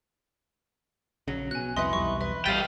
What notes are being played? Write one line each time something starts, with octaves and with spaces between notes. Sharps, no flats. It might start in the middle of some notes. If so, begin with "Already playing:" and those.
A#1 C#3 F#3
B2 G#5 F#6
C2 F2 D#4 E4 B4 C6 F#6
B1 E2 G3 C#6
B4 E5
A#1 G3 F5 G5 A6 B6 D#7